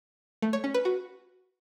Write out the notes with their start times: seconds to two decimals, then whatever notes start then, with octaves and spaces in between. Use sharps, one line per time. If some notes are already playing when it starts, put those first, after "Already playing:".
0.42 A3
0.53 C#5
0.64 C#4
0.74 B4
0.85 F#4